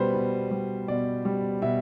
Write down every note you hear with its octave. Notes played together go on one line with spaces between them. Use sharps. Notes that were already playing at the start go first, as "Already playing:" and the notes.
Already playing: B2 G3 B4 C5
B2
G3
B2 D5
G3
B2 E5